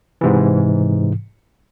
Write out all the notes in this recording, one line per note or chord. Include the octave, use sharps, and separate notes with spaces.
G#2 C3 E3